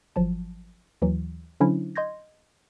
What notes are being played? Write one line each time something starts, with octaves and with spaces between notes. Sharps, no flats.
G#1 F3 F#3 A5
D#2 E3 F#3
D3 F#3 C#4 D4 E4 C5
D#5 C6 G6 G#6 A#6